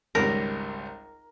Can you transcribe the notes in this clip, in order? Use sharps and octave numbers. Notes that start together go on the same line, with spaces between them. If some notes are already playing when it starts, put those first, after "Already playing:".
G#1 C#2 G3 A#4